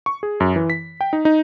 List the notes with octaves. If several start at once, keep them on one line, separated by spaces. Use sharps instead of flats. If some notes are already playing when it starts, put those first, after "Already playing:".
C#6
G#4
F#2
E3
B6
G5
D#4
D#4